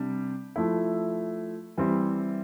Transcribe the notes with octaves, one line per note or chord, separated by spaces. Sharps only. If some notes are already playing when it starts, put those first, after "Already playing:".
Already playing: C3 G3 D4
F3 A3 E4
E3 G3 C4 E4